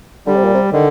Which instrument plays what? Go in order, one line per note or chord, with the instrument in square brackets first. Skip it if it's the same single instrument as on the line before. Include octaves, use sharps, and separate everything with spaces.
[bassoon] D3 [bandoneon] G3
[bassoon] C3
A#2
C3
[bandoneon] D3 [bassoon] D#3